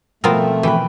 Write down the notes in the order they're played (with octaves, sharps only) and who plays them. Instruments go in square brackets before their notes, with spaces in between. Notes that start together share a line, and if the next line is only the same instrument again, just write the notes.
[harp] B2 F3 [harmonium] A3 [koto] B3 F4 A#4 [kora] C4
[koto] E3 [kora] B4 G5